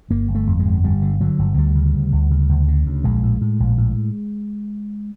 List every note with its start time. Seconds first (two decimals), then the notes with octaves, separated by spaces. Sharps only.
0.10 G1 A#3
0.28 G1
0.35 A3
0.47 F2
0.59 G#3
0.65 G1
0.84 G1 G3
1.02 D3
1.21 D3 F#3
1.39 G1
1.57 D2 G3
1.76 C#3
1.94 D2
2.12 D2
2.31 C#3
2.49 D2
2.68 C#3
2.86 D2
3.04 A#1 G#3
3.23 A2
3.41 A2
3.60 A#1
3.78 A2